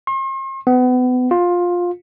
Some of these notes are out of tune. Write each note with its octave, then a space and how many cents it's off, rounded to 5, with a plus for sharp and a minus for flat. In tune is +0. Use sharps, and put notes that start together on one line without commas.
C6 +45
B3 +30
F4 +15